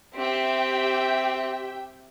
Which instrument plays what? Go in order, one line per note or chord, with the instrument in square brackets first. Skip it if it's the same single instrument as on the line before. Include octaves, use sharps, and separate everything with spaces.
[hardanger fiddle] C4 [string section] G4 E5 G5